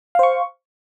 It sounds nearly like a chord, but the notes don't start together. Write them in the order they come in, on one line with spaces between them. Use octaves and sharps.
F5 C5 C#6